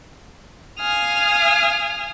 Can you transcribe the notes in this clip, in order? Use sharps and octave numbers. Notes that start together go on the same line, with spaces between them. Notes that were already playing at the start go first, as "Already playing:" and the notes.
F5 G#5 D#6 F6